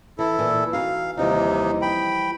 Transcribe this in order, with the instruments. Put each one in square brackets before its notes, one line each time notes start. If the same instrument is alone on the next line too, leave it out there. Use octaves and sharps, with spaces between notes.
[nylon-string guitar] E3 [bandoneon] E4 A4
[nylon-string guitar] A#2 E3
[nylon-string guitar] E3 D#4 F#4 [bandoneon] F5
[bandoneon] D#2 C3 D#4 [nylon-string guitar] E3 F3 G3
[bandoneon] G5 B5